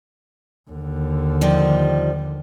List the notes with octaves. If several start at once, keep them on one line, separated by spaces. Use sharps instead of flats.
D#2 D3
D#3 F3 G3